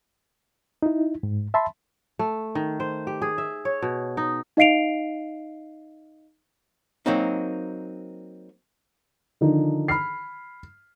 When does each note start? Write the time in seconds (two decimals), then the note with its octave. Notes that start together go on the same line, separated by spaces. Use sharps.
0.83 D#4 E4
1.23 G#2
1.54 E5 A5 B5 C6
2.19 A3
2.55 D#3
2.80 C5
3.07 G4
3.22 G#4
3.38 E5
3.65 C#5
3.82 B2
4.17 D#4
4.57 D#4 D#5 F5 C7 D7 F7
7.06 F#3 A#3 C4 D#4
9.41 D3 D#3 F3 D4 D#4
9.88 B5 F6 C7